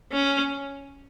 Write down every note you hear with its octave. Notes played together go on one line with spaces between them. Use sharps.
C#4